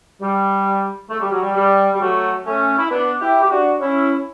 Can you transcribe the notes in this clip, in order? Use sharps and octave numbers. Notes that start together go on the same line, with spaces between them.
G3
A3
G3
F#3
G3
G3
G3
F#3 A3
A3 C#4
E4
B3 D4
E4 G4
G4
D4 F#4
C#4 E4